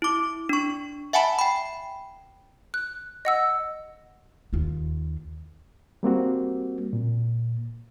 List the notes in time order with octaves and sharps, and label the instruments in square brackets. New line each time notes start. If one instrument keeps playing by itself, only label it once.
[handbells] E4 D6
D4 C#6
E5 F#5 G#5 A5 B5
G5 B5
[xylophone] F#6
D#5 F#5 E6
[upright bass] D#2 F4
[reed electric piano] G3 A#3 C4 F#4
A#2